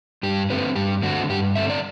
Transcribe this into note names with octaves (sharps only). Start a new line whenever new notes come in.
G2 G4
D3 A3 C4 B4
G2 G4
D3 A3 C4 F#4
G2 G4
D3 A3 C4 E5
D5